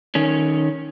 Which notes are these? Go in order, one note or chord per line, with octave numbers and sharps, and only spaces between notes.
D#3 C#4